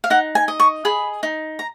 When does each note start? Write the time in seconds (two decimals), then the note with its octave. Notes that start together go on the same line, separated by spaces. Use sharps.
0.04 F5
0.10 D#4 F#5
0.35 G#5
0.48 D#5
0.60 C#6
0.85 G#4 B5
1.23 D#4
1.59 A#5